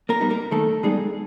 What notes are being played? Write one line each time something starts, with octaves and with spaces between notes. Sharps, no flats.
A#3 A#4
G3 B3 D#4
A#3 A#4
D#3 A3 A4
G3 G#3 B3 D#4 G#4